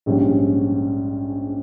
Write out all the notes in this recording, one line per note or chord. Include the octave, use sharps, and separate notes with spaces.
A#1 G#2 G3 C#4